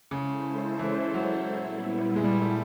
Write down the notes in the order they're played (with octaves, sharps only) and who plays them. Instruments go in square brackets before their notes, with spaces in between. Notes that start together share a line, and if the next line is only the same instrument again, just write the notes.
[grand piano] C#3 [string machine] G#3 C#4 E4 A4 C5
[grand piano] E3
F#3
[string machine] A#2 G3 B3 E4
[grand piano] G#3
G3
A3